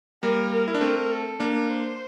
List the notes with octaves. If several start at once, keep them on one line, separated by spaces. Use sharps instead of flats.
G3 A#3 A#4
A#4
E4
D4
A3 C4
A4
A#3 D4 A#4
C5